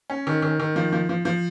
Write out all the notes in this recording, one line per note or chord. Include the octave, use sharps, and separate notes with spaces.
C#4
D#3
D#3
D#3
F3
F3
F3
F3